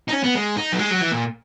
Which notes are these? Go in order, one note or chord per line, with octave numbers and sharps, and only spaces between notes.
D#4
C#4
B3
G#3
D#4
F#3
G#3
F#3
E3
A#2